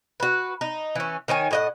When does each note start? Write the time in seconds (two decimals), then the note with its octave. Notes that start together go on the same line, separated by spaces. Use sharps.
0.20 F#4 B4
0.61 D#4
0.95 E3 C#4
1.28 D#3 D#4 C#5 G#5
1.51 A2 D#5 F#5